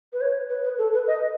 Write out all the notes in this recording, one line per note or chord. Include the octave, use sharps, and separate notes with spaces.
B4
C#5
B4
B4
A4
B4
D#5